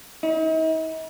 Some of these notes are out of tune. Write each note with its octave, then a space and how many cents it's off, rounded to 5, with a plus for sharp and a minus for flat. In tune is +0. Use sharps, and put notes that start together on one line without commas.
D#4 +45